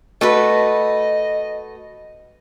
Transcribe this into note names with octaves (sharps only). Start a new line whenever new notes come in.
A3 F#4 B4 D#5